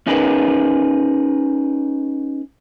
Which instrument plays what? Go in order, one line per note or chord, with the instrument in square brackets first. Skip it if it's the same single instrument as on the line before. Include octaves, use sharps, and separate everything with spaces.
[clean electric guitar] C#4 D#4 G#4 A#4 B4